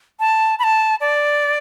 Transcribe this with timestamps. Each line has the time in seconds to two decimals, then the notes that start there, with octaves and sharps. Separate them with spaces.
0.20 A5
0.59 B5
0.64 A5
1.01 D5